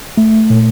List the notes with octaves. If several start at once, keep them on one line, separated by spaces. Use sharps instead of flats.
A3
A#2